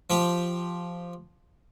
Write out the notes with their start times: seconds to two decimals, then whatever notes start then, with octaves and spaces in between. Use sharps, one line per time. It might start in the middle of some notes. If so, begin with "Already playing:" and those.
0.10 F3 G4